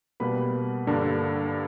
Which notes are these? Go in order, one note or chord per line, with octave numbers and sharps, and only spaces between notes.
B2 G3 A#3 B4 B5
G2 D3 A#3 D4